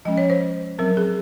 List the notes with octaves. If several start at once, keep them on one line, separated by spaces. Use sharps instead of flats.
F3 G#3 C#4 D#5
C#5
C5
F#3 C4 A#4
G#4